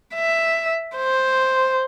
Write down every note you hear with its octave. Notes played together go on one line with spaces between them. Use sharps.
E5
C5